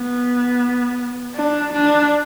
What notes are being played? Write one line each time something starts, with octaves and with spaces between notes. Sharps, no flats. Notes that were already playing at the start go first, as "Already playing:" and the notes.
Already playing: B3
D4
D4